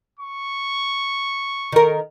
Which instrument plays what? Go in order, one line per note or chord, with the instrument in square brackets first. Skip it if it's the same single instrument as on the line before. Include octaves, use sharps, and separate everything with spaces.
[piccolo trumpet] C#6
[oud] D#3 A#4